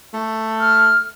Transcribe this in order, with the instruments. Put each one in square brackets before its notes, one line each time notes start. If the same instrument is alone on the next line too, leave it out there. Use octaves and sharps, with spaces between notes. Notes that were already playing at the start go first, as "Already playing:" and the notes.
[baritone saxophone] A3
[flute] F6